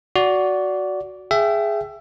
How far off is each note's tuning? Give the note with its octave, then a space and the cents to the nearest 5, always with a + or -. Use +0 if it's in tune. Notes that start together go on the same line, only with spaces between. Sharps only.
F#4 +0 D5 -15
G#4 +0 E5 +20 G5 -25